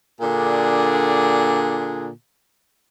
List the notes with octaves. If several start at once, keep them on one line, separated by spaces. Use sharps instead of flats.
A#2 D3 D4 G#4